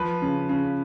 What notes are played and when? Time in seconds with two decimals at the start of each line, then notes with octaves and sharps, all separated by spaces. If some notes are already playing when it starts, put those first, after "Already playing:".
Already playing: F3 B4
0.22 C#3
0.49 C#3